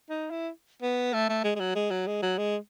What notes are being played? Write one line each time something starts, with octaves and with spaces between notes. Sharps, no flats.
D#4
E4
B3
A3
A3
G#3
G#3
F#3
G#3
F#3
G#3
F#3
G#3